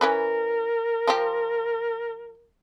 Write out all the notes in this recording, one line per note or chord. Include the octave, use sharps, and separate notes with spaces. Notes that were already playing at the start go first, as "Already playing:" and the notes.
E3 C#4 A#4 B4
F3 F4 G4